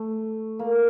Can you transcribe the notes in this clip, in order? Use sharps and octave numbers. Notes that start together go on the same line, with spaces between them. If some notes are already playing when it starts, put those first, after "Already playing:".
Already playing: A3
A#3